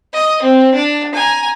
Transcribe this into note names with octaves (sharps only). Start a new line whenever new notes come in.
D#5
C4
D4
G#5 A#5